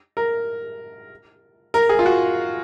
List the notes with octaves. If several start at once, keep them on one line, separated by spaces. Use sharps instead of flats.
A#4
A#4
G#4
F4
F#4